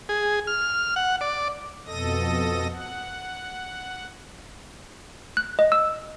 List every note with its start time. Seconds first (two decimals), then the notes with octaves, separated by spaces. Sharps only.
0.09 G#4
0.47 F6
0.96 F#5
1.21 D5
1.87 F2 B2 A4 D#5 D#6 A#6
2.71 F#5
5.37 F#6
5.59 D#5
5.72 E6